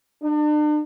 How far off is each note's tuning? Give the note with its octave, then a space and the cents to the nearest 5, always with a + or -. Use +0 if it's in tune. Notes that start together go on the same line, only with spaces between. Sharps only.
D4 +40